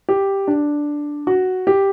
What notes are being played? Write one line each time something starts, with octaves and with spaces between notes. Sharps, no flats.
G4
D4
F#4
G4